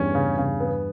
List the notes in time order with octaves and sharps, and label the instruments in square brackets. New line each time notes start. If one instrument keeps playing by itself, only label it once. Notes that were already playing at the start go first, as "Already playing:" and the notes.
Already playing: [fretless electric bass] E2 G2 [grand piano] C#4
[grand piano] C#3
C#3
B3